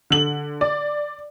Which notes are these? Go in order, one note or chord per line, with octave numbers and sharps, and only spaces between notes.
D3 F#7
D5